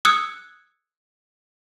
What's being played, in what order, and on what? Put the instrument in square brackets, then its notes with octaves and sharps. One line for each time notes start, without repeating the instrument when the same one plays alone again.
[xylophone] D#6 E6 F#6 G#6 C#7